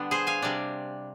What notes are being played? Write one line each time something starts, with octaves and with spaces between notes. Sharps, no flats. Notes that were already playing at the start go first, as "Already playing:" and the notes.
Already playing: D3 G3 B3 D4
G#4 C5
F5 G#5
C3 G3 D4